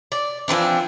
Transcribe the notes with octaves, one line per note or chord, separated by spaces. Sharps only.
D5
E3 F3 C4 D4